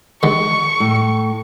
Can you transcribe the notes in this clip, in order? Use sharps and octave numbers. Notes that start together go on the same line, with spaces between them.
D3 D#3 G#3 C#6
A2